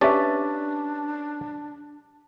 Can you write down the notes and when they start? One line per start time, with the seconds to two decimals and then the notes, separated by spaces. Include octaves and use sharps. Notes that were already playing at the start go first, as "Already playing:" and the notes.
0.01 C#4 D4 G4 B4 D5 E5 A5